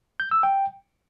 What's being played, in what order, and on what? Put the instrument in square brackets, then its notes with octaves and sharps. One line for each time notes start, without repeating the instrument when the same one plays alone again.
[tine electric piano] G6
E6
G5